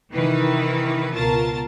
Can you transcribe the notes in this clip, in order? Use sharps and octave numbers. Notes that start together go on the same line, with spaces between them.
C3 D#3 E3 B4
C#2 B2 F4 A#4 A5 A6